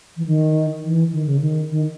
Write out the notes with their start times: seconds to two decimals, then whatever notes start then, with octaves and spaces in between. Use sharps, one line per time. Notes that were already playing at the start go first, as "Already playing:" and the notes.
0.17 E3
0.26 D#3
0.84 E3
1.12 D#3
1.26 C#3
1.41 D#3
1.70 D#3